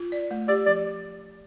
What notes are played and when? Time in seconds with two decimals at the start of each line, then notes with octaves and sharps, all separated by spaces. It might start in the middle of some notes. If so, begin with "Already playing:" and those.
Already playing: F4
0.12 D5
0.31 A3
0.48 G4 D5
0.66 F3 D5